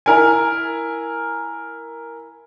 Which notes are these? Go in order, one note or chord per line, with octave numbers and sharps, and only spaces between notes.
E4 A#4 G#5